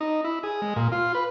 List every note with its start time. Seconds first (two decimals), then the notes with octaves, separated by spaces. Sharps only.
0.01 D#4
0.24 E4
0.43 G#4
0.62 G#3
0.76 A#2
0.92 F4
1.15 B4